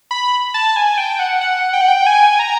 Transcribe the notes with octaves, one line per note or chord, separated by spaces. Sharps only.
B5
A5
G#5
G5
F#5
F#5
G5
F#5
G5
G#5
A#5